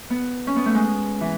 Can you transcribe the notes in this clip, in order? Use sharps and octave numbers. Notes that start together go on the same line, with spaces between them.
B3
C#4
B3
A3
G#3
E3